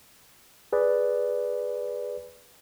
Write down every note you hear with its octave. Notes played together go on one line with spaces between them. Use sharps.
G#4 B4 D5